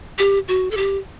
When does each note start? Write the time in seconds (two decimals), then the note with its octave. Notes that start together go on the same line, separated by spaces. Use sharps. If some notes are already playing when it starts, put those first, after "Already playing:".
0.19 G4
0.48 F#4
0.71 A4
0.77 G4